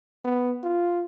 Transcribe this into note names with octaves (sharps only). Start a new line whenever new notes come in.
B3
F4